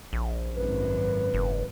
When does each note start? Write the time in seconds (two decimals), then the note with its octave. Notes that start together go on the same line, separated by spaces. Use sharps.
0.13 A#1
0.56 G#1 F#2 B4
1.34 F#1